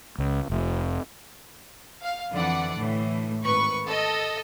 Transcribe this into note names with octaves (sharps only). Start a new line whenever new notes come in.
C#2
F1
F5
F2 D3 E3 D5 F#5
A2 E3
G#1 B4 C#6
A4 D#5